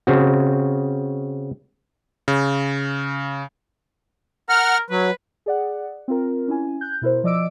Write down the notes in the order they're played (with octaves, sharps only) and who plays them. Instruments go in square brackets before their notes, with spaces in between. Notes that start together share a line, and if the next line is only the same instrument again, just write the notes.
[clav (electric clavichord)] C#3 C4 F#4
[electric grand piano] C#3
[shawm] A#4 [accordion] F#5 F6
[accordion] F#3 [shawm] B4
[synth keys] G#4 D5 F#5
C4 F4 A#4
C#4 E4 G#5
F#6 G6
B2 E4 A#4 C5
F3 D5 D#5 D6 E6 D7